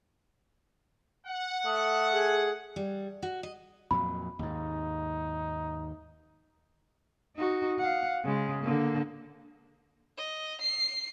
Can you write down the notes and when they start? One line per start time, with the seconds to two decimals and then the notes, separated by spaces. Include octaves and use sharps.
1.27 F#5
1.66 A3 D#6
2.12 G#4
2.76 G3
3.23 F#4
3.43 D#5
3.91 F2 A#2 F#3 B5
4.39 D#2 G#2 D#4
7.36 D#4 F#4
7.79 F5 F#5
8.25 C#3 G#3
8.63 D3 A#3
10.17 D#5
10.60 C7